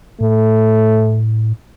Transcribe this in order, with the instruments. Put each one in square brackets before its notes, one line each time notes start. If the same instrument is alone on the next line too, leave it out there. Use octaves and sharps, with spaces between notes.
[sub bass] A2 [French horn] A3